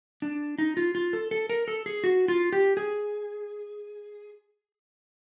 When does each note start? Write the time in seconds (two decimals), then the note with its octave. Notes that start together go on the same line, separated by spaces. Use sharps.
0.22 D4
0.58 D#4
0.77 F4
0.95 F4
1.13 A4
1.31 A4
1.50 A#4
1.68 A4
1.86 G#4
2.04 F#4
2.28 F4
2.53 G4
2.77 G#4